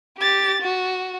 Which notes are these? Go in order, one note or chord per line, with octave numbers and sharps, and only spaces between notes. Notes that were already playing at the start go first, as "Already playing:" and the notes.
G4 A6
F#4